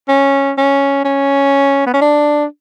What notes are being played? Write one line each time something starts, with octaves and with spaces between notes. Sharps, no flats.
C#4
C#4
C#4
B3
C#4
D4